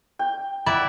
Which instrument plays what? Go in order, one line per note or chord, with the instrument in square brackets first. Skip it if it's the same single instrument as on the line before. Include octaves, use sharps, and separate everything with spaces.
[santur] G5
[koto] E4 D5 E5 [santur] F#5 B5